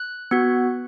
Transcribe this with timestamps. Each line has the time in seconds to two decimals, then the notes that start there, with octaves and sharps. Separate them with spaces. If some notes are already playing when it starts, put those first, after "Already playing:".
Already playing: F#6
0.31 B3 F#4